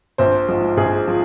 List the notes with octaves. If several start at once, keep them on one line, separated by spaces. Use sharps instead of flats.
A#1 C5
G#2 F3
A#1 G#4
F3